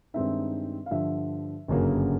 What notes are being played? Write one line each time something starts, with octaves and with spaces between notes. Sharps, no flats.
G2 D#3 G#3 C4 D#4 E5
F5
G2 D3 F3 E5
G1 F#2 C#3 F#3 A#3